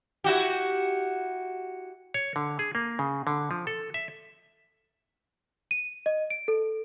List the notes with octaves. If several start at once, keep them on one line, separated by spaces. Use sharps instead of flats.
E4 F#4 G4
C#5
D3
G#4
A#3
C#3
D3
F3
A4
E5
D#7
D#5
D7
A4